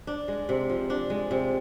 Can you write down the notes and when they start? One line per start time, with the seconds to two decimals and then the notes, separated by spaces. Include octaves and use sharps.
0.07 D4
0.28 G#3
0.49 C3
0.70 F3
0.90 D4
1.10 G#3
1.31 C3